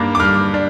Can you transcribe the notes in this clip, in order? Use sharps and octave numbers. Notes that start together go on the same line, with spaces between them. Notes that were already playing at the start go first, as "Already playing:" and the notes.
Already playing: G2 G3 A#3 D4
D6
G2 F6
D4